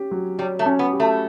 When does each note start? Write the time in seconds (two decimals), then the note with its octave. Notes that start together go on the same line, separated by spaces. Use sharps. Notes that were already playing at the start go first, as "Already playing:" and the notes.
Already playing: C#4 G4
0.11 F#3
0.39 G3 C#5
0.59 A3
0.66 C#4
0.79 B3
0.93 G4
1.00 A3